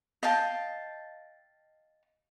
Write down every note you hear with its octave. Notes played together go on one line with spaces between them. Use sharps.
D#5 F5 G5 A5